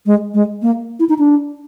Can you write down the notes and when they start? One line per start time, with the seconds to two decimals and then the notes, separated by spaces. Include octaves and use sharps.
0.06 G#3
0.34 G#3
0.62 A#3
1.00 E4
1.09 D#4
1.18 D4